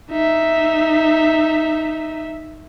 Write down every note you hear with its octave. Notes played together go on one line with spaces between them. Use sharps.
D#4 E5